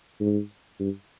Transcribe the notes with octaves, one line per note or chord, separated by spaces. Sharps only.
G#2
G2